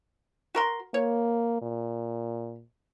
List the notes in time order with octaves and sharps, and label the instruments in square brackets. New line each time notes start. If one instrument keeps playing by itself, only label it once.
[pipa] F#4 A#4 C6
[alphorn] A#3 [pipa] C#5
[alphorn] A#2